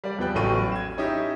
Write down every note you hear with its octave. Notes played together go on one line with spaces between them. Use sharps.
G3 D5
E2 F3 B3 G5 F#6
A1 A2 F#3 G5 C#6 D#7
G#6 E7
C#4 D#4 E4 G4